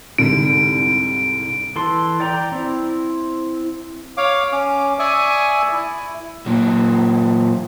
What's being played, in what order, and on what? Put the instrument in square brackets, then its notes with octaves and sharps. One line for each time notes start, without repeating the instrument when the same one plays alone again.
[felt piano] C2 G#2 D3 [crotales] D7
[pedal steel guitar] E3 A4 C6
D5 G5 A#5
C4 E4
[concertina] C#5 F5 D6
C#4 D6
D5 E5 G#5 C#6 D#6
E4
[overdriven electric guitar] A#2 F#3